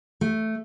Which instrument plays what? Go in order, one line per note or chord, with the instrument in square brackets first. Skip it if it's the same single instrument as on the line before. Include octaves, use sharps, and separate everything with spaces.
[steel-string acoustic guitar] A3